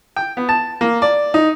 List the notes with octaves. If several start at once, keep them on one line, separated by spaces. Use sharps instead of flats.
G5
B3
A5
A#3
D5
D#4